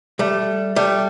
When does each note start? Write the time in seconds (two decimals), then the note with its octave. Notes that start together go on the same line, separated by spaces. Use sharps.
0.19 G3 A3
0.76 G3 A3